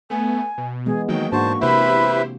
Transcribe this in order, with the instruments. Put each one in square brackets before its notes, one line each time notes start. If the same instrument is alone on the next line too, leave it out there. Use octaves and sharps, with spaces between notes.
[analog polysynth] A3 B3 [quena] G#5
[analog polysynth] B2
[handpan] E3 G#3 B3 [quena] G#4
[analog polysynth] D#3 F#3 G5 [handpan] A#3 F#4 [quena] D#5
[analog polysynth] G#2 [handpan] A#3 D4 F#4 [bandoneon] C5 A5 [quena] C#6
[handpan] C3 A#3 [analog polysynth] E4 G4 C5 [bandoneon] B4 E5 [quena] B5